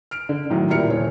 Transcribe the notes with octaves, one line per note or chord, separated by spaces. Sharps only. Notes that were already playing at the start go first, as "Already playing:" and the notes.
F6 D7
D3
A2 D#3 E3 F#3
A#2 G3 E4 A#4 F6 C#7
D#1 C#5